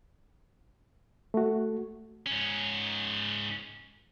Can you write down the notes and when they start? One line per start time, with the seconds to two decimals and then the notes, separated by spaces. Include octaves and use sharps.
1.34 A3 F#4
2.26 G#2 C#4